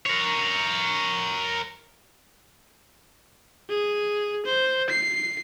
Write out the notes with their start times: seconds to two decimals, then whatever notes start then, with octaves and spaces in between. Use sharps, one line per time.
0.06 A#4 C#5
3.69 G#4
4.46 C5
4.90 C7